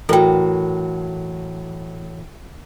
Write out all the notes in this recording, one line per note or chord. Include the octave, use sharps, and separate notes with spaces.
A2 E3 F#3 A4 A#4 G5